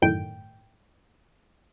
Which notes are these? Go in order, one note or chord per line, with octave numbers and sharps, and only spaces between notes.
G1 F#2 A2 D#3 G5